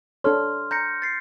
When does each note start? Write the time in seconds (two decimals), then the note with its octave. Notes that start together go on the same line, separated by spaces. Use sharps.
0.24 D4 A4 C#5 C6 F6
0.71 A#5 G6 A#6 C#7
1.02 A6 C7